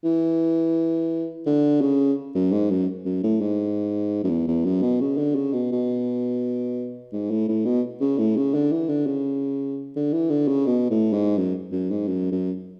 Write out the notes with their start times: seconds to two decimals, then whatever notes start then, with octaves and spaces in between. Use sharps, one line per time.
0.04 E3
1.46 D3
1.81 C#3
2.34 F#2
2.52 G#2
2.70 F#2
3.05 F#2
3.23 A2
3.41 G#2
4.24 F#2
4.29 E2
4.47 E2
4.65 F#2
4.82 B2
5.01 C#3
5.17 D3
5.35 C#3
5.53 B2
5.71 B2
7.12 G#2
7.30 A2
7.48 A2
7.65 B2
8.00 C#3
8.18 A2
8.37 C#3
8.54 D3
8.72 E3
8.89 D3
9.06 C#3
9.96 D3
10.13 E3
10.30 D3
10.48 C#3
10.66 B2
10.90 A2
11.13 G#2
11.37 F#2
11.72 F#2
11.91 G#2
12.08 F#2
12.32 F#2